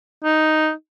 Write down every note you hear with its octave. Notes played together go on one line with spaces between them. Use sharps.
D#4